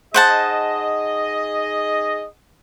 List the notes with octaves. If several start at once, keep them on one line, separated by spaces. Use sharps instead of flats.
D#4 G#4 C5 D#5 F#5 A5